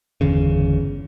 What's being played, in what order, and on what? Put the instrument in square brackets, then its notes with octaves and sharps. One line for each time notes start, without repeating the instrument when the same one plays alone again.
[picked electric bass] G1 E2 C#3